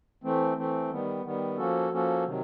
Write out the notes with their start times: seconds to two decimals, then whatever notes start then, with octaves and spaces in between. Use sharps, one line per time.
0.24 E3 A3 C4
0.57 E3 A3 C4
0.90 D#3 G3 B3
1.24 D#3 G3 B3
1.58 F3 A#3 C#4 F#4 A4
1.91 F3 A#3 C#4 F#4 A4
2.25 C3 D#3 F#3